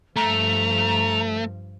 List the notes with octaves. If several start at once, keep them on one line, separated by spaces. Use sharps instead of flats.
G2 F3 A3 A#5